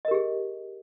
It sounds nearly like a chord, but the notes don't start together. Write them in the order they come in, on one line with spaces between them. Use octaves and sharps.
D#5 A#4 G4 G#4